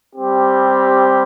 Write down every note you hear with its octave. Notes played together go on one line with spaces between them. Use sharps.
G3 C4 G4